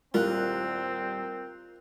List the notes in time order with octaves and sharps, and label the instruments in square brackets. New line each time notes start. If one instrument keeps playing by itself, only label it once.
[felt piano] D#1 C2 [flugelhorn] C4 [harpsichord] F4 [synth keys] A#4 F#6